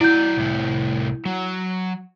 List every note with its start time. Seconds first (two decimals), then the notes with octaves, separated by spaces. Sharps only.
0.01 F#3 E4 D5 G6
0.37 C2 A2
1.25 F#3